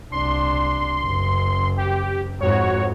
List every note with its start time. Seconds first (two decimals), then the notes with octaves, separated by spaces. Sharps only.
0.12 C2 D4 C6
1.01 F#1
1.77 G4
2.41 F2 G#2 F#4 C#5